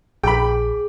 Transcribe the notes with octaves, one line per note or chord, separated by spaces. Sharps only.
A#1 G#4 G5 B5 D6